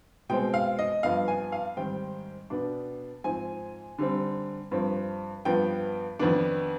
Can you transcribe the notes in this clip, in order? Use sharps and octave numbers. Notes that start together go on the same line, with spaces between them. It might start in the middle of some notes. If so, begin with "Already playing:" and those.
B2 G#3 C4 G5
F5
D#5
G2 F3 B3 F5
G#5
F5
G#2 D#3 G3 C4 G5
B2 B3 D4
G#2 F3 C4 G#5
D3 G3 C4
G2 F3 C4
G2 F3 B3 G5
F2 D#3 B3 D4